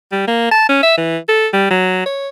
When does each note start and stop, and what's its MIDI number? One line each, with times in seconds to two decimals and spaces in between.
0.12 0.24 55
0.28 0.47 58
0.52 0.67 81
0.69 0.80 61
0.83 0.96 76
0.97 1.17 52
1.29 1.47 69
1.53 1.66 55
1.71 2.06 54
2.06 2.29 73